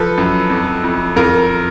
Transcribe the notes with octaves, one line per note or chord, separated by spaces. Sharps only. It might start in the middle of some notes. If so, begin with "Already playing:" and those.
Already playing: F3 A4 B4
F#2
F2
F2
F2 A#4